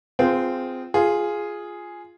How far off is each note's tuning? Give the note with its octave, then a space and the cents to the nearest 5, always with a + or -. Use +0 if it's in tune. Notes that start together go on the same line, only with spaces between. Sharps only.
C4 -15 F4 +0 G#4 +0
F4 +0 G#4 +0